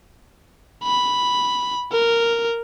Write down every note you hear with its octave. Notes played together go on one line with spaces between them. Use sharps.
B5
A#4